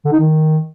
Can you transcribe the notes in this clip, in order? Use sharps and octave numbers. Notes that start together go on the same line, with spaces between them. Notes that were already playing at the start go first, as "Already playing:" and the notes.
D3
D#4
D#3